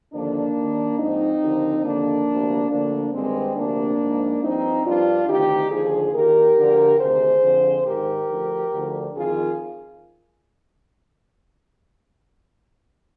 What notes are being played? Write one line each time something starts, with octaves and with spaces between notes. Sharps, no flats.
D#2 D3 F3 A#3 D4
D#2 D#3
G#2 F3 C4 D#4
D#2 D3 F3
D#2 D3 F3 A#3 D4
D2 C3 F3
D2 D3 F3 A#3 D4
G2 D#3 G#3 C4
D2 C3 F3 A#3 D4
G#2 F3
G2 F3 C4 D#4
G2 F3 D4 F4
D2 C3 D#3 D#4 G4
D#2 D3 F3 F4 G#4
D#2 D#3 G4 A#4
D2 D3 F3
D2 C3 D#3 G#4 C5
F2 D3 F3
G#2 D#3 G4 A#4
D2 D3 F3
D2 D3 F3
F2 D#3 F4 G#4